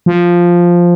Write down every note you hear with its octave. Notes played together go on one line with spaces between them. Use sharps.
F3